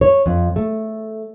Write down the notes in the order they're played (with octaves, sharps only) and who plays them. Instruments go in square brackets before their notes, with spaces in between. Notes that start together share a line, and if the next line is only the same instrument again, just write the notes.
[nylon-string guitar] C#5
F2
A3